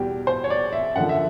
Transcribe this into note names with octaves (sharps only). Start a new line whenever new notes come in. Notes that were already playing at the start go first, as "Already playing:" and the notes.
Already playing: E2 B2 G3 G4
C5
C#5
D5
E5
F#2 D3 F3 F#5
E5